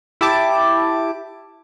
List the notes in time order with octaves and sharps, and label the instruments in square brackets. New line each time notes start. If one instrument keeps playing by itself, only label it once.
[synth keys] E4 G4 A5 D6